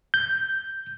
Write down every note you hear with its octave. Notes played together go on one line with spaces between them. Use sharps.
G6